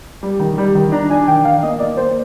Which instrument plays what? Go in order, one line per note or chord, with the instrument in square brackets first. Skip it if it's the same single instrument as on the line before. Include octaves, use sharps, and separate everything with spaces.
[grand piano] G3
D#3
G3
D#3
[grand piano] D4 [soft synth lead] A#5
[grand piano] D4 [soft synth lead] G#5
[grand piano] D#3 [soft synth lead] G5
[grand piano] D#3 [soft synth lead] F5
[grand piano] A#3 [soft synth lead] D#5
[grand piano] A#3 [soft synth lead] D5
[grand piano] A#3 [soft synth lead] C5